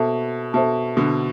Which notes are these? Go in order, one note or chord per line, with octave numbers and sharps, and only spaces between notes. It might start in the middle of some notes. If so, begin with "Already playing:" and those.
Already playing: B2 A4 C5 E5 A5
B2 A4 C5 E5 A5
B2 D3